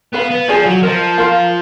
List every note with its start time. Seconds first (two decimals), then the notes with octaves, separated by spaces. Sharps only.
0.14 B3 B4 F5 B5
0.31 B3
0.48 F3 G#4 D5 G#5
0.66 F#3
0.83 F3 A#4 D#5 A#5
1.18 F4 A#4 F5 A#5